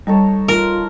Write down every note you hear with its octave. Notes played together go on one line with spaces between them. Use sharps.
G3 D#4 A4 C#5
F4 A#4